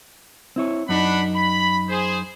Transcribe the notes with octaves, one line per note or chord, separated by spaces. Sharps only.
C4 E4 C#5
F#2 D4 D#4 F#5 B5
B5
G#4 C5